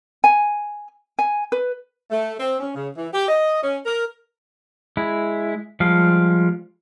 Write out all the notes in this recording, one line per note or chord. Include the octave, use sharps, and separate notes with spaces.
G#5
G#5
B4
A3
C4
C#4
C#3
E3
G4
D#5
C#4
A#4
G#3 E4
F3 G3 G#3 F5